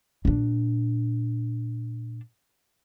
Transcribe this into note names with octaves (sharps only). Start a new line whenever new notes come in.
A#2 D4